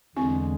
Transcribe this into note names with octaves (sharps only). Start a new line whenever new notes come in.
E2 D3 G#3 C4 E4